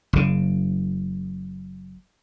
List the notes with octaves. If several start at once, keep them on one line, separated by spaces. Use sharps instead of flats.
F#1 C#3